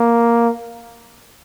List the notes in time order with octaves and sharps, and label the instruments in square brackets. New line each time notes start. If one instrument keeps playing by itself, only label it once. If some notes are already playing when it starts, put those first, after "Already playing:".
Already playing: [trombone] A#3